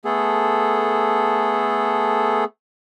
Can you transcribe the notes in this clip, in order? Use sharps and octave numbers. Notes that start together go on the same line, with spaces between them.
A3 B3 G#4 A4